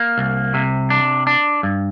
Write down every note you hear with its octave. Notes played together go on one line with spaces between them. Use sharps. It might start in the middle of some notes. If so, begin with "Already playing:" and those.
Already playing: A#3
C2
C3
D4
D4
G2